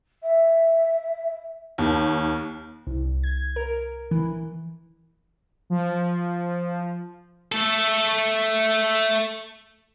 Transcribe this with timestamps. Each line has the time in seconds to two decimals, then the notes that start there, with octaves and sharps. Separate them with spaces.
0.23 E5
1.78 D#2
2.87 C2
3.24 G#6
3.56 A#4
4.11 E3
5.70 F3
7.52 A3 A4